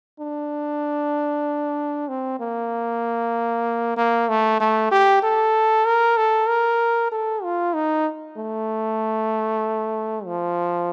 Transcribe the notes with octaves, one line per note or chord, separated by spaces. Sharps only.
D4
C4
A#3
A#3
A3
A3
G4
A4
A#4
A4
A#4
A4
F4
D#4
A3
F3